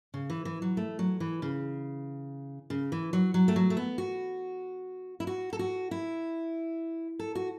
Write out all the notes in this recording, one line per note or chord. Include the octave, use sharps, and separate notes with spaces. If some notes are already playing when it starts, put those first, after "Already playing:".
C#3
E3
E3
F#3
A3
F#3
E3
C#3
C#3
E3
F#3
F#3
A3
F#3
A3
B3
F#4
E4
F#4
A4
F#4
E4
A4
F#4